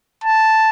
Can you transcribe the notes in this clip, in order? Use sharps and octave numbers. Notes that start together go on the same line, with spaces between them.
A5